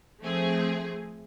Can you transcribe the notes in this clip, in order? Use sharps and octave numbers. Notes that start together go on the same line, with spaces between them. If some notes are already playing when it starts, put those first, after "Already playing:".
F3 A3 C4 G#4